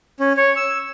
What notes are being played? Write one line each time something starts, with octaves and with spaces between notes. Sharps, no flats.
C#4
C#5
E6